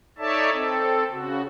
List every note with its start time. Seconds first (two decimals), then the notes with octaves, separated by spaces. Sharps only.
0.18 D#4 A4 C#5 D5 E5 A5
0.52 C4 A4
1.11 C#3 F#4